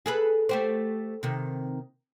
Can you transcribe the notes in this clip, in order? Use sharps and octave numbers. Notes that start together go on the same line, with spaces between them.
G#4 A4 B4
A3 G4 C5
C3 D#3